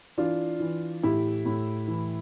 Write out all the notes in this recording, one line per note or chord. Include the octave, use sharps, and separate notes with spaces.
E3 D4 F4
E3
A2 E4 G4
A2
E3